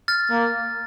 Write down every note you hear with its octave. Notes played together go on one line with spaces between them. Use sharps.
F6 A6
A#3